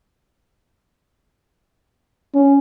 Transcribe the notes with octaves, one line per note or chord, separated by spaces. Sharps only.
C#4